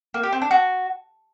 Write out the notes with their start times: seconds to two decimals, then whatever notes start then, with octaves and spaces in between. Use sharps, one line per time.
0.14 A#3
0.23 G4
0.32 C4
0.42 D4
0.51 F#4